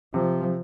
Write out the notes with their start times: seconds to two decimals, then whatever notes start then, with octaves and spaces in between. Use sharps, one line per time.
0.14 C3 F3